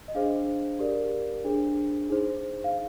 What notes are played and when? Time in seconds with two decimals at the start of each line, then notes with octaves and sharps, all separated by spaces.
0.08 D#5
0.15 D4 G#4 C5 F5
0.79 G4 A#4 D5
1.44 D4 G#4 C5
2.09 D#4 G#4 C5
2.64 F5